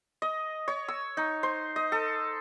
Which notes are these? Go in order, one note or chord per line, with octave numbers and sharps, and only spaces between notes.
D#5
C#5
E6
D#4
C5
D#5
A4